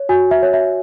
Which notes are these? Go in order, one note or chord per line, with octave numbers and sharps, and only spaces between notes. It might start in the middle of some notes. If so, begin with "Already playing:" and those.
Already playing: C#5
F#4 G#5
E5
C#5
E5